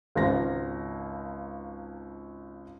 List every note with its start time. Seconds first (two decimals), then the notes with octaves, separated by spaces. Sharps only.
0.15 G#1 C#2 A#6